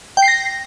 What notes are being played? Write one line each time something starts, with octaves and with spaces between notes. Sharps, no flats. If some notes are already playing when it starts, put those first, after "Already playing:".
G5
C7
A#6